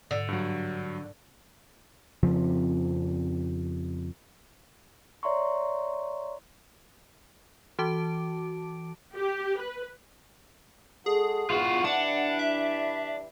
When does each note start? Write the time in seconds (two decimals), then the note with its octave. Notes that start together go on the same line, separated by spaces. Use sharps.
0.11 G#2 D3
0.28 G2 F#3
2.23 F2 C#3 F3 C4
5.23 C#5 D5 E5 A#5 C6 C#6
7.79 E3 F#4 A5 D6 D7
9.15 G4
9.60 B4
11.06 G#3 F#4 G#4 A4
11.50 G#3 B3 F4 F#4
11.85 E3 G3 D4 E4 F#5
12.39 E5